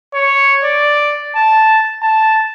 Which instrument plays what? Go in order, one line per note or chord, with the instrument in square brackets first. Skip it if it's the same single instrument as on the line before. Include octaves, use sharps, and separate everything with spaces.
[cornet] C#5
D5
A5
A5